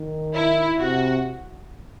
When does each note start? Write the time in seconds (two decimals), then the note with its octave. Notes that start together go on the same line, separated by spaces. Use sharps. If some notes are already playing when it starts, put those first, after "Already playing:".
Already playing: D#3
0.34 E4
0.78 C3 F#4